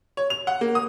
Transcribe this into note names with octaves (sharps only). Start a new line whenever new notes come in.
C#5
F7
F#5
A#3
D#6